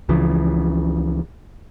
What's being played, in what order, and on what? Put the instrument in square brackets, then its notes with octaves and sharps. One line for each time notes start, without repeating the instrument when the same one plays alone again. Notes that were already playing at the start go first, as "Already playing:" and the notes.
[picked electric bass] C#2 C#3 E3 F3